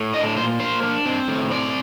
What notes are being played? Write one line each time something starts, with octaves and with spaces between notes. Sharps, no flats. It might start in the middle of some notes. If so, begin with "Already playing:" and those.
Already playing: A2
D4 D#5
A#2 C5
A#3 C5
D4
C4
A2
C4 D5